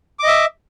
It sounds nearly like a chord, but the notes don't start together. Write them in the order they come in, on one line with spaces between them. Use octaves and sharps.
D6 D#5 E5